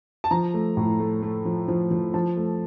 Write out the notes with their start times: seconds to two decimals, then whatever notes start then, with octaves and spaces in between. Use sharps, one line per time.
0.24 A5
0.31 F3 A#5
0.54 A3
0.77 A2
1.00 A3
1.22 A3
1.45 F3
1.68 F3
1.91 F3
2.14 F3 A5
2.37 A3